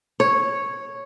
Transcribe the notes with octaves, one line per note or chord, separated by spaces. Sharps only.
C#5